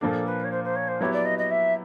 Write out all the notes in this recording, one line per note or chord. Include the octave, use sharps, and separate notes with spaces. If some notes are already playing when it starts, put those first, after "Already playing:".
A#2 F3 A#3 D4 A4
B4
C#5
C5
C5
C#5
C5
F#3 B3 E4 G4 C#5
D5
D#5
D#5
E5